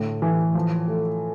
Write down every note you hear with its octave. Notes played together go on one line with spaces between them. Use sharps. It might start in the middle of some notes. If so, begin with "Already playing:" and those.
Already playing: A2 D3
E3
F3
A3